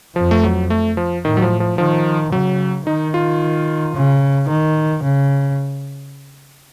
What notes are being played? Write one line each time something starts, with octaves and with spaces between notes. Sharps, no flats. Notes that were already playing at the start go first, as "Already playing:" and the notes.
F2 F3
A3
F#3
A3
F3
A2 D#3
F#3
F3
F3
D#3 F3
C#3 F#3
D#3 D#4
F4
C#3
D#3
C#3